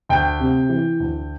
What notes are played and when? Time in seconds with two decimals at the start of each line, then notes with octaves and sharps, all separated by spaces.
0.09 D2 G5
0.40 C3
0.69 E3
1.00 D2